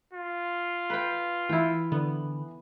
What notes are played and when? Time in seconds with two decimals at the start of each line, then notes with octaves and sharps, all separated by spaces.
0.13 F4
0.90 B4 G5
1.49 E3 E4 G5
1.92 D3 B3